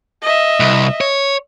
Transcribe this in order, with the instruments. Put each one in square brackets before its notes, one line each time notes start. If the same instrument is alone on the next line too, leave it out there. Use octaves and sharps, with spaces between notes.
[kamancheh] D#5 E5
[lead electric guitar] C2
C#5